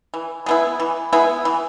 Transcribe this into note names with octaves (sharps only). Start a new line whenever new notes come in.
E3
G#3 B3 E4
E3
G#3 B3 E4
E3